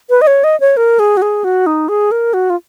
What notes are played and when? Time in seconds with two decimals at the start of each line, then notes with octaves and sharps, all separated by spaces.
0.10 B4
0.21 D#5
0.27 C#5
0.44 D#5
0.60 C#5
0.77 A#4
0.99 G#4
1.17 F#4
1.22 G#4
1.44 F#4
1.66 D#4
1.89 G#4
2.11 A#4
2.34 F#4
2.50 F4